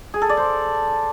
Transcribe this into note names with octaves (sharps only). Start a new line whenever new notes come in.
G#4
A4
D5
C5